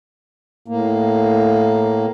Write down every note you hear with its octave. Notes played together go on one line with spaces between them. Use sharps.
A2 A#3